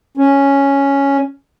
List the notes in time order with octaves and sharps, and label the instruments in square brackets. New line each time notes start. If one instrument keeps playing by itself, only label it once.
[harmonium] C#4